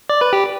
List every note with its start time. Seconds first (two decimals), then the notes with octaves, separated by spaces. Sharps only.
0.10 D5
0.21 B4
0.33 G4